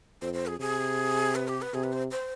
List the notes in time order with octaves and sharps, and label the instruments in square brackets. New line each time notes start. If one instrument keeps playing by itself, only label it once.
[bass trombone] F2 [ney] C5
[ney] C5
G#4
[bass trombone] C3 [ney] G#4
[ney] B4
G4
B4
[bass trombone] C3 [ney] G#4
[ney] B4
C5
C5